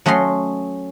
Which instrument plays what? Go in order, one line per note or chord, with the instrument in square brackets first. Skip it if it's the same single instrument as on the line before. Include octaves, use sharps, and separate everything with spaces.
[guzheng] F#3 A3 C#4 D#5 C6